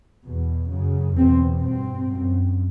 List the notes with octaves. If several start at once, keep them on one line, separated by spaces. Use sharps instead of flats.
E2 B2
F#2 C#3
E2 B2 C4
G2 C4
F#2